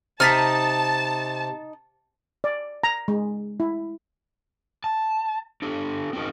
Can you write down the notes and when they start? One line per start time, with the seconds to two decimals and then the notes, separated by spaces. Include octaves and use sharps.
0.20 C3 D#4 A5 F6 A6 B6
2.44 D5
2.83 A#5
3.08 G#3
3.60 E4
4.84 A5
5.62 D4 G4 A4
6.13 C4 C#4 D#4 F#4 G#4 A#4